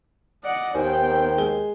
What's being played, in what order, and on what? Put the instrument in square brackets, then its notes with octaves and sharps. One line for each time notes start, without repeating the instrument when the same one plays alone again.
[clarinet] D5 [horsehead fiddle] D#5 F#5
[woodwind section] D#2 [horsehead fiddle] B3 G5 [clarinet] C5 [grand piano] G#5
[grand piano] G#3 G#4 G7